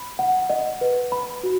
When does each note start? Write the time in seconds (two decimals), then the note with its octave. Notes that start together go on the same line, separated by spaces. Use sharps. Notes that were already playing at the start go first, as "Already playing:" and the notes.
Already playing: B5
0.19 F#5
0.50 D#5
0.81 B4
1.12 B5
1.43 F#4